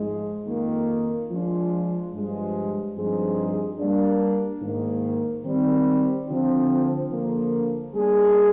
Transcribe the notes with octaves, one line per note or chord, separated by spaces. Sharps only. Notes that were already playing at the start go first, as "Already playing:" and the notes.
Already playing: G#2 F3 G#3
F2 D#3 A#3
F3 G#3 D4 F4
G2 F3 G#3
G2 F3 C4 D#4 G#4
G3 A#3 D4
G#2 D#3 A#3
D#3 G3 C4
D3 F3 C4
D3 F3 A#3
G3 A#3 D4 G#4